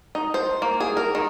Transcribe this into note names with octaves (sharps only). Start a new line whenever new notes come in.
D#4
C5
A#3
G#4
A#4
D#3